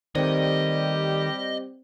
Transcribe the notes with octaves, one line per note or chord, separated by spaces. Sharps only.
D#3 G3 A3 C4 G4 C5 D5 D#5